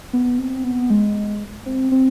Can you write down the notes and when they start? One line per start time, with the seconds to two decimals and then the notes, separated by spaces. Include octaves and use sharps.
0.13 B3
0.38 C4
0.64 B3
0.90 G#3
1.66 C4
1.91 C4